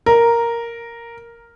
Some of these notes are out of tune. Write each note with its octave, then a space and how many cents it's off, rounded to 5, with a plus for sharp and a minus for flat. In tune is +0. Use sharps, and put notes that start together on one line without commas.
A#4 +0